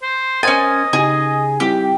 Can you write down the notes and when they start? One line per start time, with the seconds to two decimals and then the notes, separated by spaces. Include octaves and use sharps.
0.02 C5
0.43 C#4 A#4 C5 D#5 G#5 A6
0.93 C#3 D#4 G4 G#4
1.60 G3 C4 E4 G4